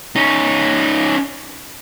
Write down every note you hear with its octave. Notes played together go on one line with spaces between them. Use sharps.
C#4 D#4